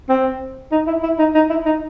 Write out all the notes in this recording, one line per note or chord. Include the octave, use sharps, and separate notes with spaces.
C4
D#4
E4
E4
D#4
D#4
E4
D#4